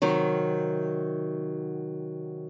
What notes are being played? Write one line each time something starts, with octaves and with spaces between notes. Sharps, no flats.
C3 D#3 F#3